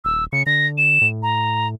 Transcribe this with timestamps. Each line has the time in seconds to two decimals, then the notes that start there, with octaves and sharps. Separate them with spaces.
0.05 D#1 E6
0.33 C#3 C#7
0.46 D3 A#6
0.78 E7
1.01 A2
1.23 A#5